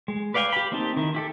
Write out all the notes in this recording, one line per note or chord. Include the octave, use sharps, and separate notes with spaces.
G#3
B4 D5 F5 G5 G#5
G4 B5
A#3 C4 D#4 G4 A5
D#3 E4
E4 G4 A4